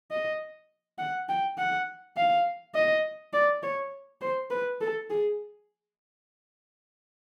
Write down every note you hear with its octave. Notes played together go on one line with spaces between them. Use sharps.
D#5
F#5
G5
F#5
F5
D#5
D5
C#5
C5
B4
A4
G#4